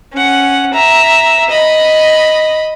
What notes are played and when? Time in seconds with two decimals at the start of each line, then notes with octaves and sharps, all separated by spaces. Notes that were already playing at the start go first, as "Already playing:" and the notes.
0.13 C#4 F#5
0.74 E5 A#5
1.50 D#5 B5